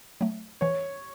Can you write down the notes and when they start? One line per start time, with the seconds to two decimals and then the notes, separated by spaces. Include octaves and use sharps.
0.21 F#3 A3
0.61 E3 C#5